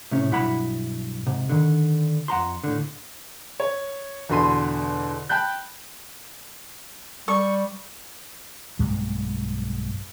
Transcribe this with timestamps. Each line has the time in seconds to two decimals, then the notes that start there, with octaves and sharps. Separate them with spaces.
0.11 A2 C3 C#4
0.30 B1 G2 E4 F#5 B5
1.26 G#2 C3
1.49 D3 D#3
2.28 F2 F#5 A#5 C6
2.64 A2 D3
3.60 C#5
4.29 E2 B2 D3 B5 C6 D#7
5.29 G5 A5 B5 F#6 G6
7.28 G3 C#6
8.79 B1 G2 G#3 A#3